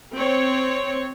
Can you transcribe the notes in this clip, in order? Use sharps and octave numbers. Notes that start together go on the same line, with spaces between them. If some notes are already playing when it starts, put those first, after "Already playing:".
C4 C#5